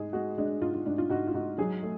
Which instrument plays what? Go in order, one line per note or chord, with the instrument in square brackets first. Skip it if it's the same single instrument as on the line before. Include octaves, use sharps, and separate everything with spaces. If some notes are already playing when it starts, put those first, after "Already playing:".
Already playing: [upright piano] G#2 G#3 G#4
G#3 F#4
G#3 D4
G#2 F4
F4
G#2 D4
F4
G#2 F#4
F4
G#2 F#4
F#3 G#4
A3